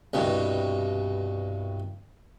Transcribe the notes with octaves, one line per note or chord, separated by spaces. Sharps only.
C2 G2 B2